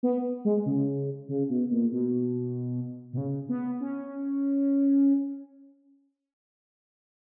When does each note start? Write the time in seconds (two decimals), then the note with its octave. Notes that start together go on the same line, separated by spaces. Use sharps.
0.03 B3
0.45 G#3
0.66 C#3
1.29 C#3
1.49 B2
1.71 A#2
1.92 B2
3.13 B2
3.18 C#3
3.49 B3
3.81 C#4